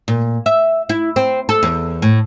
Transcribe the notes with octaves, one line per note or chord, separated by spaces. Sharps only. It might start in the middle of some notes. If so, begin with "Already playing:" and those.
A#2
E5
E4
C4
A4
E2
A2